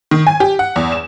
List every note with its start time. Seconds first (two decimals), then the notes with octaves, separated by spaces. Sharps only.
0.11 D#3
0.27 G#5
0.40 G4
0.59 F#5
0.76 E2
0.92 E7